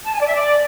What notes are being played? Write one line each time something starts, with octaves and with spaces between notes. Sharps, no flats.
A5
G#5
D5
E5
D5